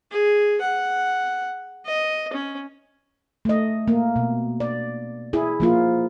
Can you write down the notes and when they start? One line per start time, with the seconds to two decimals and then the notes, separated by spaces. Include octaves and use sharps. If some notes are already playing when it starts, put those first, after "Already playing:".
0.11 G#4
0.61 F#5
1.86 D#5
2.33 C#4
3.45 A3 D#5
3.88 A#3
4.16 B2
4.60 D5
5.33 E4 G#4
5.60 F3 A#3 F4